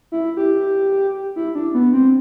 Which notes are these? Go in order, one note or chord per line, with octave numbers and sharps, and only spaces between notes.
E4
G4
E4
D4
B3
C4